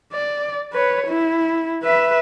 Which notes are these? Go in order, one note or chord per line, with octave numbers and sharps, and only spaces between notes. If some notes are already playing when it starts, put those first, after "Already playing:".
D5
B4 C#5
E4
B4 E5